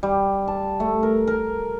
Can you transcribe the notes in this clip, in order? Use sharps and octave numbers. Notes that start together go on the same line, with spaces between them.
G3
A5
A3
A#4
A#4